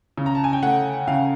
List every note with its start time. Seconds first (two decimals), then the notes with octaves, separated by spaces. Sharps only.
0.18 C#3
0.26 A#5
0.35 A5
0.44 G#5
0.53 G5
0.62 A3 F#5
1.07 C#3 F5